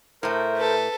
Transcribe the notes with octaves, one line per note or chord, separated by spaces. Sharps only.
A2 A3 A#4 C5
A4 B4